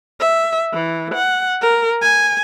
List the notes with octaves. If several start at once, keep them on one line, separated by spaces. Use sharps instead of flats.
E5
E3
F#5
A#4
G#5